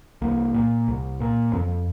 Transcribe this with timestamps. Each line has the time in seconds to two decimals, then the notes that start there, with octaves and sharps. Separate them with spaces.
0.22 C2 A#3
0.54 A#2
0.88 C2
1.20 A#2
1.53 F2 C4